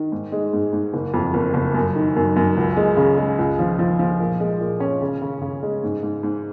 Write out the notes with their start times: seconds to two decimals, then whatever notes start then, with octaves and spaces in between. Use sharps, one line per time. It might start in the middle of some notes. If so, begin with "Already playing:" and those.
Already playing: D#3
0.12 G#2
0.32 G#3
0.53 G#2
0.73 G#2
0.94 F#1
1.14 F2
1.34 F#1
1.54 F#1
1.74 F#2
1.96 D#3
2.16 F#2
2.36 F#2
2.57 C#2
2.77 G#3
2.97 C#3
3.17 G#3
3.39 C#2
3.59 F3
3.79 F3
3.99 F3
4.20 A#2
4.40 G#3
4.61 A#2
4.80 C#4
5.02 C#3
5.22 C#3
5.42 C#3
5.63 G#3
5.83 G#2
6.03 G#2
6.23 G#2